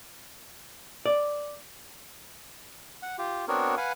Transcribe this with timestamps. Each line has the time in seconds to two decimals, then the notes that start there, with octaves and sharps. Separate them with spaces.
1.06 D5
3.03 F#5
3.19 F4 G4
3.48 B3 C4 D4 F#4 A#4 C#5
3.77 B4 F5 F#5 G#5